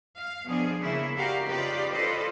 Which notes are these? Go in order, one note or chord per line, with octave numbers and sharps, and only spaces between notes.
F5
B2 F3 D4 G#4
C#3 A#3 E4
F#4 G4 A#4 D5 F5
C#3 D#4 F4 G4 B4 D5
F4 A4 B4 C5 D5 D#5